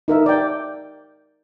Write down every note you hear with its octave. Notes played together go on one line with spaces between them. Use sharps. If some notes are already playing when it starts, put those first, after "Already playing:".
D#4 A#4 E5
D5 G5